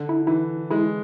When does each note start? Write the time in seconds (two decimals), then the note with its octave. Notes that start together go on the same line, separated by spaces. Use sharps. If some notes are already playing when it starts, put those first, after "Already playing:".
Already playing: D3
0.09 E4
0.27 E3 E4
0.70 G#3 E4